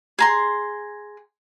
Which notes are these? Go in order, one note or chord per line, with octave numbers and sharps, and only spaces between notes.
G#4 A#5 C6